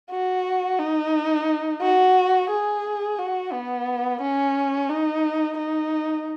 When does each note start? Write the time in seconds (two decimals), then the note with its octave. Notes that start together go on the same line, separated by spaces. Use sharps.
0.10 F#4
0.79 D#4
1.81 F#4
2.49 G#4
3.18 F#4
3.52 B3
4.20 C#4
4.89 D#4
5.57 D#4